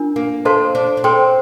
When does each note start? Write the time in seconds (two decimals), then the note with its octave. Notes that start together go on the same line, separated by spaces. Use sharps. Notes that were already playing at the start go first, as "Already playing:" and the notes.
Already playing: D4 F4 A#4
0.16 A#3
0.45 C4 A4 C5 F5 A5 C6
0.75 D4
0.97 D4
1.04 C4 A4 C5 G5 C6